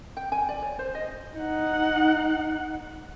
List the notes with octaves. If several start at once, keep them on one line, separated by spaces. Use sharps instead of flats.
G5
G#5
D5
C#5
C5
D#5
D#4 F#5